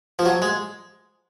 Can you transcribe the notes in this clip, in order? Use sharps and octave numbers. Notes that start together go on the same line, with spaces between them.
F3
F#3
G#3